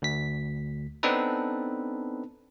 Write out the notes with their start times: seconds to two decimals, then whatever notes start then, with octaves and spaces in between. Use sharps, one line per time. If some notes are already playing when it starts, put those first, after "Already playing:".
0.02 D2 B6
1.03 B3 C4 D4 D#4 A4 B4